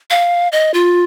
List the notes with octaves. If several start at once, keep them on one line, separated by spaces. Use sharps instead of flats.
F5
D#5
F4